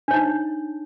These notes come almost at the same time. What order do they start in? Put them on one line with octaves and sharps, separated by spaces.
D4 C#5 D#4